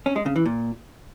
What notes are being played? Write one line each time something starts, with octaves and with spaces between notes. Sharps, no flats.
C#4
G#3
C#3
E3
A#2